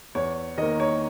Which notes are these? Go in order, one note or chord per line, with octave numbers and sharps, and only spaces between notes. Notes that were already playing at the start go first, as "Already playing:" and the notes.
E2 C#5
D#3 A#3 D#5
C#5